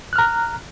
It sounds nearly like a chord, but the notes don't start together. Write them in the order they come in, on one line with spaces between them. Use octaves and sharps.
F#6 F6 A#5